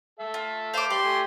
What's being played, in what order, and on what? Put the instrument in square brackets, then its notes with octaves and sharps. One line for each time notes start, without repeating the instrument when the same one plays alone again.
[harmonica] A4 E5
[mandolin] F4
[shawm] C5 [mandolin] F5 D6
[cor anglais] G4 [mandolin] D5 [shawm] C6
[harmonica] A3 G#5